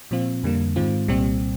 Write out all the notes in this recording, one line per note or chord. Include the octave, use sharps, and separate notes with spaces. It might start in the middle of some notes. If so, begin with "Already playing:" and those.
A#2 F3 C4 F4
F2 D3 G3 A#3
G#2 D#3 G#3 C4 F4
C2 A#2 G3 C4 G4